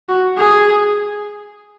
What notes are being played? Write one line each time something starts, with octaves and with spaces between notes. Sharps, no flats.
F#4
G#4